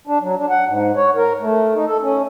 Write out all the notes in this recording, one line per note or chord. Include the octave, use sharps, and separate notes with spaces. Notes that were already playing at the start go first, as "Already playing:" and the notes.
D4
F#3
D4
F#5
G#2
C#5
A#4
A3
D#4
A4
C#4